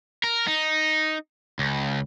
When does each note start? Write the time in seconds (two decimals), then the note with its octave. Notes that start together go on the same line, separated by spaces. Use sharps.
0.24 A#4
0.47 D#4
1.59 C#2